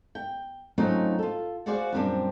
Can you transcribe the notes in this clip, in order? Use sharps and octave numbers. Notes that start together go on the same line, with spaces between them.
G5
F#3 A3 C4 C#4 D#4 F4
F4 A4
F#4 G#4 C5 D5 F5 F#5
F#2 A#2 G3 B3 C4 D4